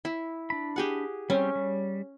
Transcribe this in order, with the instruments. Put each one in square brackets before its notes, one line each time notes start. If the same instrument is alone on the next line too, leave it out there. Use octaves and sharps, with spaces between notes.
[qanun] E4
[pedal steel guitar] D4 B5
[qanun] G4 G#4 F#5
[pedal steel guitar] G3 C4 G4 [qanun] C#4
[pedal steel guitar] G3